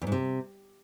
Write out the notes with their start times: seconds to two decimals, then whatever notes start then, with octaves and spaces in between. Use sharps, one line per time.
0.02 E2
0.07 G#2
0.12 C3